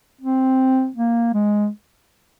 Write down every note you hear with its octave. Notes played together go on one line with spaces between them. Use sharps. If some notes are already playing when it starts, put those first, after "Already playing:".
C4
A#3
G#3